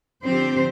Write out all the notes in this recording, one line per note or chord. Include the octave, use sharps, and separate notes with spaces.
D3 F3 C4 G4 C5